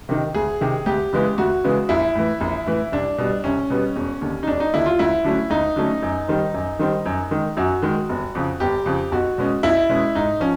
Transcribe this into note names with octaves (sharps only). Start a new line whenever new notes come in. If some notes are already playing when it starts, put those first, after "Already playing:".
C3 D#3
D2 G#4
C3 D#3
D2 G4
C#3 E3 G#3 B3
D2 F#4
C#3 E3 G#3 B3
A#1 E4
A2 E3
A#1
A2 E3
C2 D4
B2 G3 B3
C2 C#4
B2 G3 B3
E1
D#2 D3
D#4
E1 D4
D#4
D#2 D3 E4
F4
D2 E4
D3 F#3 A3 C#4
D2 D#4
D3 F#3 A3 C#4
F#2
D#3 G3 C4
F#2
D#3 G3 C4
F#2
D#3 G#3
F#2 F#4
D#3 G#3
G1
F2 C#3
G1 G4
F2 C#3
B1 F#4
B2 G#3 C#4
B1 E4
B2 G#3 C#4
G#2 D#4
F3 C#4